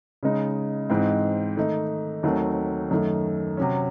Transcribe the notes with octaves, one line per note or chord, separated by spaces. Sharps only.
C#3 G#3 D#4
G#2 E3 G#3 C4
D#3 A3 D#4
D#2 D#3 F#3 A3 C4
F#2 D#3 A3
C3 F#3 C#4